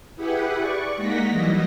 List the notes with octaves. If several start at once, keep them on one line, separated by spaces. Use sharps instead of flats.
E4 G4 G#4 B4 F#5
D5 C#6
G#3 A#3 D#4 F#5 A#6 B6
E3 F#3 G3 D#5 A#6